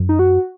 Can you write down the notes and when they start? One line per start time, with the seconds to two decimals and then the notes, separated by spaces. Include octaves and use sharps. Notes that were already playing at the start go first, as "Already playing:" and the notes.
Already playing: F#2
0.09 D#4
0.19 F#4